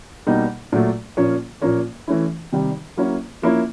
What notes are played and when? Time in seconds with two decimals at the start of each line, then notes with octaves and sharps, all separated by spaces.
0.27 B2 G3 A#3 D#4
0.72 A#2 F#3 A3
1.17 A#2 F3 A#3 C#4
1.62 A#2 F3 A#3 C#4
2.08 E3 A3 C#4 E4
2.53 C3 D#3 G3
2.97 F#3 A#3 C#4 E4
3.42 F3 A#3 C#4 E4